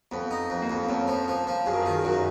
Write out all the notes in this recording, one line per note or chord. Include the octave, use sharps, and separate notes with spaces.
F2 B3
D#4
F2
A#3
F2
B3
F2 A#3 C#4
F3
F3
F3
F#2 G#4
A#4
D#3 F4 G#4
F#2 F#4 A#4